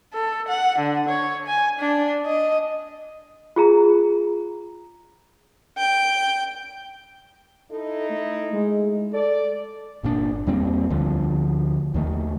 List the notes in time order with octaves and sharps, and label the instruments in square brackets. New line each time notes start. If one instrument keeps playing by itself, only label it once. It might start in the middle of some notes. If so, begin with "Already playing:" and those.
[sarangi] A4
F#5
D3
C#5
G#5
D4
D#5
[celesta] F4 G#4 A#5
[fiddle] G5
[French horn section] D#4 E4 [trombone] A4
[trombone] A3
G#3
[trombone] A4 [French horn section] D5
[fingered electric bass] G1 A#2 D3 D4
E2 G3 A#3 C4
D2 D3 F3
D#2 D#3 A3